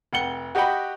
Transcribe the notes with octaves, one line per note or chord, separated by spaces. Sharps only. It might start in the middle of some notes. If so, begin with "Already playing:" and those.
F1 F#5 G5 C#7 G7
F#4 G4 D#5 F#5 G5 B5